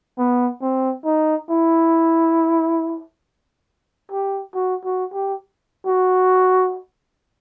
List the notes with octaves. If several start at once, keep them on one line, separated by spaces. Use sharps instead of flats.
B3
C4
D#4
E4
G4
F#4
F#4
G4
F#4